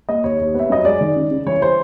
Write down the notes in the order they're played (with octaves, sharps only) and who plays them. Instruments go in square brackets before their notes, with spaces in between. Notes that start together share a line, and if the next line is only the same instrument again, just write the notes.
[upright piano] A#3 D#5
D#2 C#5
D#2
B3 E5
F#2 D#5
G#3 D5
D#3
C#3
C#3
E3 C#5
E3 C5